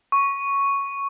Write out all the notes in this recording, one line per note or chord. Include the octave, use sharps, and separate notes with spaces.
C#6